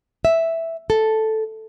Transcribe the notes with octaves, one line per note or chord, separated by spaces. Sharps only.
E5
A4